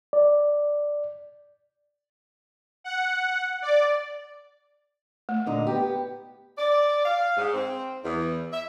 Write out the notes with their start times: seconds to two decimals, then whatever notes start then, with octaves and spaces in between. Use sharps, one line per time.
0.13 D5
2.84 F#5
3.62 D5
5.29 A3
5.46 A#2 D3 D#4
5.67 B3 G4
6.58 D5
7.04 F5
7.37 G#2
7.53 C4
8.04 E2
8.52 E5